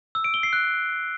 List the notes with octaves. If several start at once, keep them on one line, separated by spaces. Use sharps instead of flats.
E6
D7
G7
C7
F#6